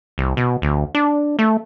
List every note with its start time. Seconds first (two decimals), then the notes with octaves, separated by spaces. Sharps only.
0.18 C2
0.37 B2
0.62 D2
0.95 D4
1.39 A3